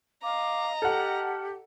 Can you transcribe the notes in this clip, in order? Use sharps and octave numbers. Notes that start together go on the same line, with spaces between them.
D#5 F5 A#5 D6
G4 A4 F#5 F6